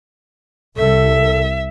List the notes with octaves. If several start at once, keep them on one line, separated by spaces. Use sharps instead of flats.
C2 A4 E5